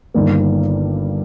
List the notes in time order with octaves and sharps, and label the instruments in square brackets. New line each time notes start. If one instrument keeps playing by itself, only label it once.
[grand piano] G1 G2 D#3 A#3